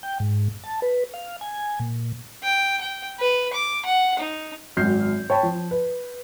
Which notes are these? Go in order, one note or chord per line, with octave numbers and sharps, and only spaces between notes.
G5
G#2
A5
B4
F5
G#5
A#2
G5
G5
B4
D6
F#5
D#4
G#1 F#2 F6 G6 C7
C#5 G5 A5 B5
F3
B4